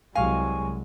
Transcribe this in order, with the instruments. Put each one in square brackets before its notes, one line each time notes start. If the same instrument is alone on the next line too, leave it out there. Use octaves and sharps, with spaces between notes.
[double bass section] C2 F#3 G#3 [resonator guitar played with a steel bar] F5 [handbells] G#5 C#6